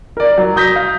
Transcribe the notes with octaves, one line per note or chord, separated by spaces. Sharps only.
A#4 D5
F#3
D#6 G6 A#6 B6
F5